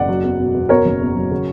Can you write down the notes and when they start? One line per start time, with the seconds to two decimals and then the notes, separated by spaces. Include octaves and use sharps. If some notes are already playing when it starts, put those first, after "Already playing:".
Already playing: F#1 D5 F#5
0.09 F#3
0.24 E2
0.40 B2
0.54 E2
0.69 B2 A#4 C#5
0.85 F#1
1.01 E2
1.15 F#3
1.31 C#3